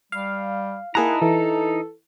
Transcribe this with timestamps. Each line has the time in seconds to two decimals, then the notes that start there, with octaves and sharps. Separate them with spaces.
0.12 G3 F5
0.95 A#3 D#4 E4 G#4 F#5 A5 A#5
1.22 E3 A4